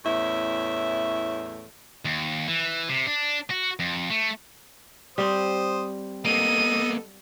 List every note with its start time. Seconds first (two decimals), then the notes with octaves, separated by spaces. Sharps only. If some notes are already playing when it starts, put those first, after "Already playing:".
0.05 E2 A2 C#4 E4 E5
2.05 D#2
2.48 E3
2.89 C3
3.07 D4
3.50 F#4
3.79 F2
4.10 A3
5.18 G3 C4 C5 D#6
6.25 A#3 B3 A4 D#5 D#7